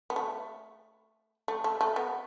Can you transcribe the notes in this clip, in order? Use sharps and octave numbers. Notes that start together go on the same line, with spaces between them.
B3
A3
A3
A3
A3
B3